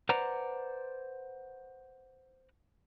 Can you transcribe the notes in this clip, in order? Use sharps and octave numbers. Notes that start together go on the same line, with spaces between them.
B4 C5 D5 F#5 A#5